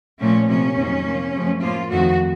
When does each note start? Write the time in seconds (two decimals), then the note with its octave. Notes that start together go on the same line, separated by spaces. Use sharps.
0.20 A#2 F3 A3 C#4
0.48 C3 F3 A#3 C#4
0.76 F2 D#3 F#3 A#3
1.05 C3 F3 A#3
1.33 F#2 C#3 F3 A3
1.61 A2 F3 A#3 F4
1.89 F2 D#3 A3 F#4